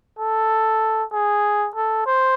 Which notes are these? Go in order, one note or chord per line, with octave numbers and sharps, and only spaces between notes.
A4
G#4
A4
C5